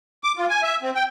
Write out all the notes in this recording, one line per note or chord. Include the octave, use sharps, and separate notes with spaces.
D6
F4
G#5
E5
C4
G5